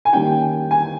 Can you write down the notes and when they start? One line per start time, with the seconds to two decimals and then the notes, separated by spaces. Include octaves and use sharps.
0.05 G#5
0.13 D#3 G3 A#3 C#4 G5
0.71 G#5